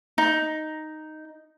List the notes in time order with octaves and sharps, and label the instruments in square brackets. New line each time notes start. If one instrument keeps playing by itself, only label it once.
[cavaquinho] D#4